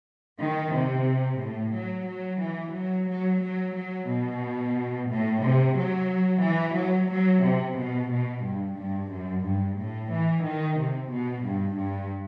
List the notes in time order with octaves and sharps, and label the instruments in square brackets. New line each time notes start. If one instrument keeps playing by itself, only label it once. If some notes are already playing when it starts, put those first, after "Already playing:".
[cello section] D#3
C3
A2
F#3
F#3
E3
F#3
F#3
F#3
F#3
B2
A2
C3
F#3
E3
F#3
F#3
C3
B2
B2
G2
G2
F#2
G2
A2
E3
D#3
C3
B2
G2
G2